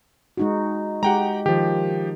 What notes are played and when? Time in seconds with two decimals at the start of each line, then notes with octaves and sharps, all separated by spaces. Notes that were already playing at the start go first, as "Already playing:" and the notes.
0.37 G#3 D#4 F#4
1.03 G#3 G4 F#5 G5 A#5
1.46 D#3 F3 G4